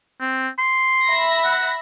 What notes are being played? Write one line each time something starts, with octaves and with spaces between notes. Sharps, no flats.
C4
C6
E5 B5 A#6
F#5